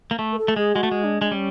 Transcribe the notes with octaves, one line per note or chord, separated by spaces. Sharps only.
A#3
A3
A#4
A4
A3
G#3 G#4
G#3 F#4
A3
G#3
D4
G#3
G3 C#4